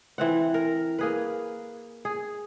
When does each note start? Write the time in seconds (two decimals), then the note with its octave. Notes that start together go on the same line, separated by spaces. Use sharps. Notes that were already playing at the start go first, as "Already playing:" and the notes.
0.18 E3 C4 F#5
0.54 A#4
0.99 A#3 G#4 B4
2.05 G#4